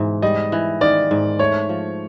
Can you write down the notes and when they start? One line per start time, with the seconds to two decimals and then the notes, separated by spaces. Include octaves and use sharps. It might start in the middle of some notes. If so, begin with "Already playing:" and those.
Already playing: G#2 B2 E3
0.22 G3 D#5
0.52 E3
0.81 D#3 D5
1.11 G#2
1.39 A3 C#5
1.69 F3